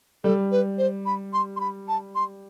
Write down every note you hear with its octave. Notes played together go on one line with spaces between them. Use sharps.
G3 A4
B4
C5
B5
C6
C6
B5
A5
C6